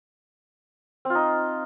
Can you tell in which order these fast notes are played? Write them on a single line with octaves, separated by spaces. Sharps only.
C4 F4 D#4